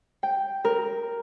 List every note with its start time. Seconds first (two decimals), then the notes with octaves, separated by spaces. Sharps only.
0.23 G5
0.65 A#4